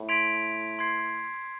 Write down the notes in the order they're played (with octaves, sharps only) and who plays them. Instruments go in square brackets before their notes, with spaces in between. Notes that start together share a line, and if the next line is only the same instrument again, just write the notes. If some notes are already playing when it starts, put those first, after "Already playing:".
Already playing: [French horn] A2
[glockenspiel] C6 G#6 B6 D7 F7
C6 G#6 C7